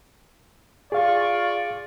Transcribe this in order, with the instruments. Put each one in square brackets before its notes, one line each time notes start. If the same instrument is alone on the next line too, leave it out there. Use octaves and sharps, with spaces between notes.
[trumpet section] F4 D5 C#6 [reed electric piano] G#4 F5